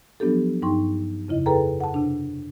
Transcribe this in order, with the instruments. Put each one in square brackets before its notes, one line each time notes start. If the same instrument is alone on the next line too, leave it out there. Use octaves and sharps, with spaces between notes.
[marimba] F3 F#3 B3 D4 G4 A4
G2 D#4 G5 C6 C#6
F2 C#3 E4 D#5
G#4 A4 B4 G5 A#5
F#5 A5
C3 D4